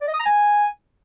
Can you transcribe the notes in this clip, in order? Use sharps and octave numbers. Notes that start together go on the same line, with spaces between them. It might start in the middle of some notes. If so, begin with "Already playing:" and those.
D5
D#5
D#6
A#5
G#5